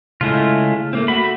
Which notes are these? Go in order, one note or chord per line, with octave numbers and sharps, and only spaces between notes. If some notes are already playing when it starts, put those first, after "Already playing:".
C#3 G#3 A3 E4 F4
A3 A#3 C4
A3 F#4 B5